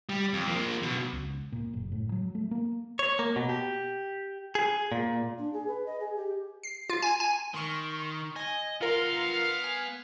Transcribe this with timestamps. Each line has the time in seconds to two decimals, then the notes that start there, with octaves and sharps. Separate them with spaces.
0.09 G3
0.33 F2
0.47 F3 A#3
0.83 B2 F#3
1.12 C#2
1.52 A#2
1.73 F#1
1.92 A2
2.12 F#3
2.35 A3
2.51 A#3
2.99 C#5
3.19 A#3
3.36 B2
3.49 G4
4.55 G#4
4.92 A#2
5.38 D4
5.53 G#4
5.68 B4
5.86 D#5
6.00 G#4
6.16 G4
6.63 C7
6.90 F4
7.02 G#5
7.20 G#5
7.54 D#3 C6 C#6 F6
8.36 D#5 G#5
8.81 B3 F4 A#4 F5 C6
9.64 G#5